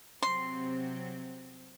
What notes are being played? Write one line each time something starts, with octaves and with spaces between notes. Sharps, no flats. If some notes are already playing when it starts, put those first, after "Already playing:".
C3 F#3 C4 C6